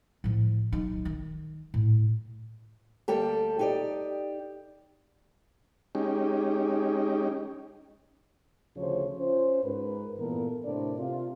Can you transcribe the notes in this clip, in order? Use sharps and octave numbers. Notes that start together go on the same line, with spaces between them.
A2 F3
B1 D#4
D#3
A2
D2 G3 A#3 G4 A4
D#4 G4 D5
G#3 C#4 D#4 G4
D2 C#3 F3 F4 C5 C#5
C#4 F4 C5
G#2 A#4 B4
G2 A#2 E3 B3 A4 A#4
A2 C3 D4 A#4 C5 D5
C3 F4